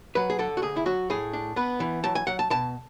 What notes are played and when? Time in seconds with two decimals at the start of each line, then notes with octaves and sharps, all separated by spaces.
0.15 F#3 B4
0.30 G#4
0.39 D3 A4
0.57 F#4
0.62 D2 G#4
0.77 E4
0.86 F#3 F#4
1.10 A2 G#4
1.33 D4
1.56 B3 B4
1.80 E3
2.04 F#3 A5
2.15 G#5
2.27 F#3 F#5
2.39 A5
2.50 B2 A5